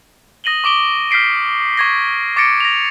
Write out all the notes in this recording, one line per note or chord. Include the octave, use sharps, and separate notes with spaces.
D#6 A#6 D#7 F#7 G7
C#6 D6 D7 G7
F6 G6 B6 C7 D7
C#6 G#6 A#6
C#6 D6 A6 A#6 C#7 D7
A#6 F7